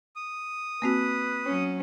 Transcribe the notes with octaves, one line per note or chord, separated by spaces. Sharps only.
D#6
A#3 C4 F#4 B4
F#3 C#4